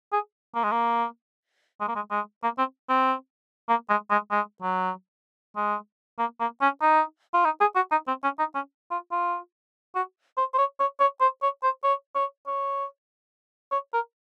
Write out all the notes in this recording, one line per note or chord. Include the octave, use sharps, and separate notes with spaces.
G#4
A#3
G#3
A#3
G#3
A#3
G#3
G#3
A#3
C4
C4
A#3
G#3
G#3
G#3
F#3
G#3
A#3
A#3
C#4
D#4
F4
D#4
G#4
F#4
D#4
C4
C#4
D#4
C#4
F4
F4
F#4
C5
C5
C#5
C#5
C#5
C5
C#5
C5
C#5
C#5
C#5
C#5
A#4